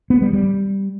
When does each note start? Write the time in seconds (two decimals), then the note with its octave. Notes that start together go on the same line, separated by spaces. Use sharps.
0.10 B3
0.22 G3
0.33 G3